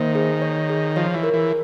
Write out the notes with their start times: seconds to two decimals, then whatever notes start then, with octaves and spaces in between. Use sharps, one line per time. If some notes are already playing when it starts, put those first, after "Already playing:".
Already playing: D#3 A#3 C5
0.15 G#4
0.42 C#5
0.69 G#4
0.96 F3 C#5
1.14 E3
1.24 A#4
1.33 E3